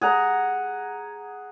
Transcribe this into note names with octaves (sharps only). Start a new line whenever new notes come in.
G#4 F#5 A#5